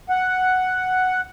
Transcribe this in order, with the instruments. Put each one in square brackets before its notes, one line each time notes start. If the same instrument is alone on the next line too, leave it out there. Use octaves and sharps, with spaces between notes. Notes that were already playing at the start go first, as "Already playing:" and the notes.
[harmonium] F#5